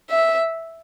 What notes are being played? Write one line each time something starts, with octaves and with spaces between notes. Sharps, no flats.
E5